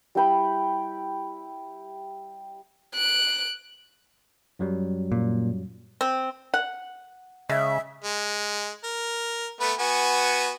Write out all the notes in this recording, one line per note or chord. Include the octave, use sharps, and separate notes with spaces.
G3 E4 G5 B5
F#6 D7
F#2 F#3 G3
A#2
C4
F#5
C#3 G#3 E5
G#3
A#4
A3 B3 B4
B3 F#4 G#5